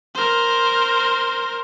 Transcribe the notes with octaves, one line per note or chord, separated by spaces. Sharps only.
A#4 C5